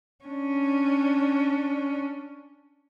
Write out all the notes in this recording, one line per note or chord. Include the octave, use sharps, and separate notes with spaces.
C#4 D4